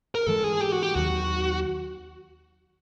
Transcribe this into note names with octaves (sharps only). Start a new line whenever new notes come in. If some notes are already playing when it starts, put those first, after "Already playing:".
A#4
G#2 E3 G#3 A4
G#4
G4
F#4
G4
D#2 D#3 F#3 F#4